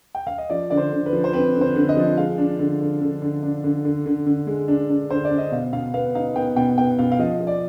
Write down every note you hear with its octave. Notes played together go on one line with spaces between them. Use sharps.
G5
F5
D#5
F3 D5
D3 D5
C5
D3
B4
F3
C5
C4 B4
D3
C5
D3
D#5
F3
G#3 F5
D4
D3
D3
D3
D3
D4
D3
D3
D3
D3
G#3
D4
D4
D3 C5
D5
D4
D#5
B2 F5
B2 F5
B3 F5
D#4 F5
B3 G5
B2 G5
B3 G5
B2 F5
F5
F3 D#5
F3
D5